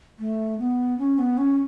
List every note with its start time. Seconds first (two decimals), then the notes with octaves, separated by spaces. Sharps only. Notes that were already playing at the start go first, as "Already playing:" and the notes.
0.19 A3
0.59 B3
0.98 C#4
1.18 B3
1.38 C#4